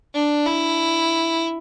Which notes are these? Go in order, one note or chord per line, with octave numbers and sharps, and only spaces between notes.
D4
E4